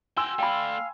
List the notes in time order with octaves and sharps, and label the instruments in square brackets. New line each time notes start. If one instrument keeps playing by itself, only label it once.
[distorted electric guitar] F#4 G5 [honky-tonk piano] G#5 C6 E6
[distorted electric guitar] A3 D5 [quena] F5 [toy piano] G5 B5